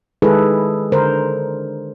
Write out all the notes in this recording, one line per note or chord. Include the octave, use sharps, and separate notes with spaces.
D#3 G#3 E4 G#4 A4 B4
D3 A#4 C5